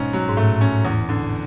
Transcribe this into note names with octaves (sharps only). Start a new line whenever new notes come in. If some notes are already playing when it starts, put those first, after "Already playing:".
Already playing: G#2 B2 C#4
F#3
G#2
A2 A3
C#4
E2
D3